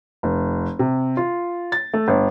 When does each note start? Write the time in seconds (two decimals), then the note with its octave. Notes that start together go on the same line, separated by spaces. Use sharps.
0.23 F1
0.79 C3
1.17 F4
1.72 A6
1.94 A3
2.08 G1